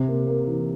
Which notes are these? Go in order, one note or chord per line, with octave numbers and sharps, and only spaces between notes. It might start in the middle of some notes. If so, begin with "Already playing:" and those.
Already playing: C3
A#3
A#3
E3